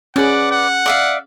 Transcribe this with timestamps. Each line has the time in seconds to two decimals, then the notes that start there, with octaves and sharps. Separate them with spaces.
0.16 C#4 G#4 B4 D5 F#5
0.51 F#5
0.86 D5 E5 F5